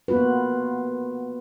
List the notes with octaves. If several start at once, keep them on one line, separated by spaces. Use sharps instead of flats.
A#3 B3 F4 F#4 B4